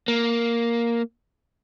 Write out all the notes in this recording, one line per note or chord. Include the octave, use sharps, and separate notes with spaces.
A#3